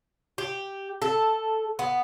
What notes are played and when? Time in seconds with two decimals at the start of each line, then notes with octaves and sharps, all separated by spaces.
0.38 G4
1.02 A4
1.79 B3